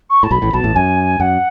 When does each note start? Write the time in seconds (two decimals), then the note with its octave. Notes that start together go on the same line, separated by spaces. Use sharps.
0.09 C#6
0.23 A2 A5
0.31 B1 B2 B5
0.42 A1 A2
0.53 B1 B2 A5
0.64 A1 A2
0.75 F#2 G#5
1.20 F#2 F#5